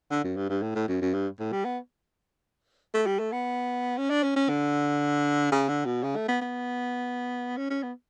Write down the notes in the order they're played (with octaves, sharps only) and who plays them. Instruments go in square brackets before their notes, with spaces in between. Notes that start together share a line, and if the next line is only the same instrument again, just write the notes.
[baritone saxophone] D3
F#2
G2
G2
A2
A2
F#2
F#2
G2
A2
G3
B3
A3
G3
A3
B3
C#4
D4
C#4
C#4
D3
C#3
D3
B2
C#3
A3
B3
B3
C#4
C#4
B3